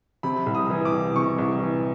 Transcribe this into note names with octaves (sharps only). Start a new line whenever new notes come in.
C3 B5
C2
D#6
E3
D6
C2
C3 C#6
C2
E3